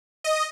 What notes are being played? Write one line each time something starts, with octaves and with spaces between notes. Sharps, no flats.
D#5